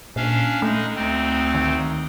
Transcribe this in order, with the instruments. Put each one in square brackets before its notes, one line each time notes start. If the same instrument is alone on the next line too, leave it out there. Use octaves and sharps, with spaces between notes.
[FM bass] A#2 [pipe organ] C#4 D4 F5
[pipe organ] G#3 D#4 [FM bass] A3
[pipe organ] D2 C4 D#4
[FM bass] D#3